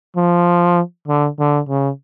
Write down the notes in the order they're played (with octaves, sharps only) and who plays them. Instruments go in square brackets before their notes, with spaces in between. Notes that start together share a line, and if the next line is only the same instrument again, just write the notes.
[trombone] F3
D3
D3
C#3